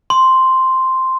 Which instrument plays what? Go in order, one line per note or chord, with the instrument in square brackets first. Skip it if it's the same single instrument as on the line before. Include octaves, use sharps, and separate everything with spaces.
[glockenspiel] C6